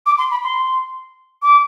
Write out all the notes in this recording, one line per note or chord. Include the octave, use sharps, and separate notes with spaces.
D6
C6
B5
C6
D6